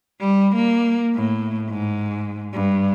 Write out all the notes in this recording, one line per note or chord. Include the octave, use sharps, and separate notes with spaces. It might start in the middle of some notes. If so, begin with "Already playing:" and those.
G3
A#3
A2
G#2
G2